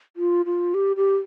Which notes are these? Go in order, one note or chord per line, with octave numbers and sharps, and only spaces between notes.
F4
F4
G4
G4